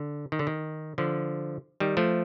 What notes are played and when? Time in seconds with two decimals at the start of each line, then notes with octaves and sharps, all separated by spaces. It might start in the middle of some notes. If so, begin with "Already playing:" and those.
Already playing: D3
0.32 D#3
0.39 D3
0.47 D#3
0.98 D3 F3
1.80 D#3 G3
1.97 F3 A3